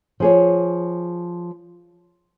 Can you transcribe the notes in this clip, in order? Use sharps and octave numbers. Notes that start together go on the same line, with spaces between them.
F3 G#4 C#5